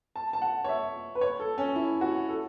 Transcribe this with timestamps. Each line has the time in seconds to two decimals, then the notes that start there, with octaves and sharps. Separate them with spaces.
0.16 A5
0.33 A5
0.42 F#5
0.64 C#5
0.69 E5
1.15 B4
1.21 C#5
1.40 A4
1.58 C#4
1.75 E4
2.01 F#4
2.28 A4